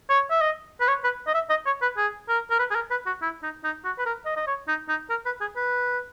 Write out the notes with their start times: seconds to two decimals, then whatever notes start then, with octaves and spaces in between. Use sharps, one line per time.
0.09 C#5
0.30 E5
0.41 D#5
0.80 B4
0.88 C#5
1.04 B4
1.27 D#5
1.34 E5
1.50 D#5
1.66 C#5
1.82 B4
1.97 G#4
2.28 A#4
2.50 A#4
2.59 B4
2.71 G#4
2.75 A#4
2.91 B4
3.07 F#4
3.22 E4
3.43 D#4
3.64 D#4
3.84 F#4
3.98 B4
4.06 A#4
4.26 D#5
4.37 D#5
4.47 C#5
4.68 D#4
4.89 D#4
5.10 A#4
5.25 B4
5.41 G#4
5.56 B4